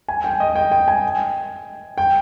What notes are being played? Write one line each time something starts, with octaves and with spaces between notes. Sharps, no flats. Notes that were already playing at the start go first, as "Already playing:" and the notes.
G#5
G5
D#5
G5
G5
G#5
G5